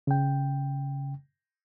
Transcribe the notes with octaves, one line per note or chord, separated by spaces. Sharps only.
C#3 G5